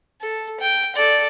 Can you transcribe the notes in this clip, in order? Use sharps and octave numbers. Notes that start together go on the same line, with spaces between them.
A4
G5
A4 D5